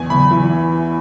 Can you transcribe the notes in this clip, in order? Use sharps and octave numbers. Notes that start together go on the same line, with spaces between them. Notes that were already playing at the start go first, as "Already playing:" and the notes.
Already playing: E2 G#5
E2 B5
E3